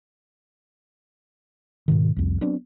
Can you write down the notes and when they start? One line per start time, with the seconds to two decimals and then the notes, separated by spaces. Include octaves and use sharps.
1.88 G#2 B2 D#3
2.16 C2 F2
2.41 F#3 B3 C4 D4